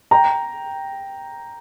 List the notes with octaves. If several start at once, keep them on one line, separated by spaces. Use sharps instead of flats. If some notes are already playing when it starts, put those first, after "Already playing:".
G5 A#5